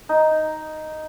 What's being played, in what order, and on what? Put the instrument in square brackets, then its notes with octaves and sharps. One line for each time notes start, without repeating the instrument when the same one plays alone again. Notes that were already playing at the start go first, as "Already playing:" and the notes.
[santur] D#4